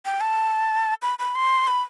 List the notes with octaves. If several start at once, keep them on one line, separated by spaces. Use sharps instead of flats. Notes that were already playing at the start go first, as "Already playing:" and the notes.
G5
A5
B5
B5
C6
B5